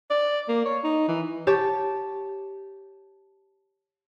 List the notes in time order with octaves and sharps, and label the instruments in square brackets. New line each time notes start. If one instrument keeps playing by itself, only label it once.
[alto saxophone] D5
A#3
C#5
D#4
E3
[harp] G4 C#5 A5